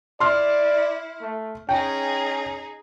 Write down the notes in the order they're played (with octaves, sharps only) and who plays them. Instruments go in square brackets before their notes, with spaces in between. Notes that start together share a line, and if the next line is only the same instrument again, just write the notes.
[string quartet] E4 [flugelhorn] D5 [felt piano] C6 F6
[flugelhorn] A3
[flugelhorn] C#4 [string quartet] D#4 G#4 [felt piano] G5